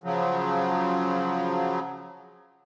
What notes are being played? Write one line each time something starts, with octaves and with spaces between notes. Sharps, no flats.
C#3 F3 F#3